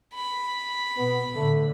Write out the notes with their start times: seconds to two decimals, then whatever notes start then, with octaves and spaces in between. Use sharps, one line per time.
0.14 B5
0.98 B2 B3
1.34 A2 D3 A3